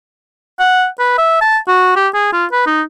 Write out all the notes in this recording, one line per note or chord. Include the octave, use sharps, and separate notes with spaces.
F#5
B4
E5
A5
F#4
G4
G#4
F4
B4
D#4